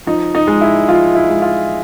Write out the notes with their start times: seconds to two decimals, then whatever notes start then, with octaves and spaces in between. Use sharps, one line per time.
0.07 F3 D#4
0.35 D#4
0.47 G#3
0.61 E4
0.88 F3 F4
1.15 E4
1.29 G#3
1.42 F4